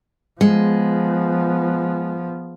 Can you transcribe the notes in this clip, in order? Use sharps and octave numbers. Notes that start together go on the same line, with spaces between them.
F3 G#3 B3